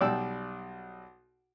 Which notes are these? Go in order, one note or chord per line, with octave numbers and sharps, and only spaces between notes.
B1 B2 G3 D5 G5 E6